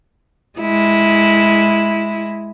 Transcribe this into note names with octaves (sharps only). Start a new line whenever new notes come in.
G#3 E4